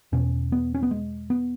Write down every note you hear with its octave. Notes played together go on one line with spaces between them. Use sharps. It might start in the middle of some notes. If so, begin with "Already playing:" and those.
E2 B2 C#4
B3
C#4
B3
G#3
B3